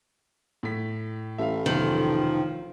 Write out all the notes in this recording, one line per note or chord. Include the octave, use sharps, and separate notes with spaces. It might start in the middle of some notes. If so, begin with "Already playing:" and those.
A2 B6
A1 E5 F5
F1 B1 D#3 F3 F#7